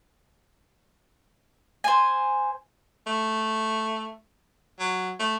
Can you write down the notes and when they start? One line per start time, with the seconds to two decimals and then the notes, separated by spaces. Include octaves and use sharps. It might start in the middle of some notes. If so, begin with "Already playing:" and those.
1.84 C5 G#5
3.07 A3
4.79 F#3
5.19 A3